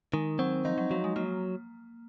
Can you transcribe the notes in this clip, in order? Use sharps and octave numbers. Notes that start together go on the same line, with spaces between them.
D#3 G#3
F#3 C4
F3 D#4
F#3
F3 F#3
G#3
F#3 A#3